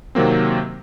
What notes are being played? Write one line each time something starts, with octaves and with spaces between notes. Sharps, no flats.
C3 D#3 F#3 A#3 C4